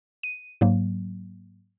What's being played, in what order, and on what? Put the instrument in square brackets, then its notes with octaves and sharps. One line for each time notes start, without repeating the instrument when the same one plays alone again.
[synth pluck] D#7
G#2 F#3 A#3